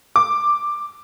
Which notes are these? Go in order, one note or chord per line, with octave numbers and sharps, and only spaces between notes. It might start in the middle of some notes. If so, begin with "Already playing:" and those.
D6